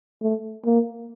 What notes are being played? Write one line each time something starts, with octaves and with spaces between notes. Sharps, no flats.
A3
A#3